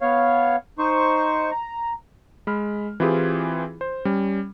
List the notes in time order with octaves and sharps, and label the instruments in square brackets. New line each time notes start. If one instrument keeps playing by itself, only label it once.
[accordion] B3 C#5 F5
D#4 C5 C#6
A#5
[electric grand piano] G#3 B5 F6
E3 C4 E4 F4 G4 G#4
C5
G3 C#4